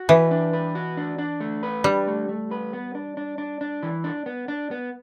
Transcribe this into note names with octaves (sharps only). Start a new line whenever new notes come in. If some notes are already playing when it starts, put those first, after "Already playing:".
Already playing: F#4
E3 B4
D4
B4
F#4
D4
D4
A3
B4
G3 D4
A3
A3
B4
B3
D4
D4
D4
D4
E3
D4
B3
D4
B3